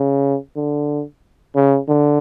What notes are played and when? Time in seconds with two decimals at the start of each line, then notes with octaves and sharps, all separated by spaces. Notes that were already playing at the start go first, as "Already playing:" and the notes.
Already playing: C#3
0.56 D3
1.56 C#3
1.89 D3